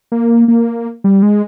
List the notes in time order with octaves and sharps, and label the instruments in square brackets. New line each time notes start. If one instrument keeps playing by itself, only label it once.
[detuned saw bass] A#3
A#3
G3
G#3